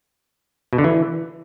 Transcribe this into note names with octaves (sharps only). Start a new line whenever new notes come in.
B2
D3
E3